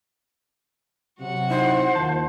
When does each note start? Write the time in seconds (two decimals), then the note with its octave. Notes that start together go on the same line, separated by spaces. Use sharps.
1.20 C3 F#3 F#4 F#5
1.50 D#4 E4 C5 D#5
1.95 D#2 D#3 F4 A5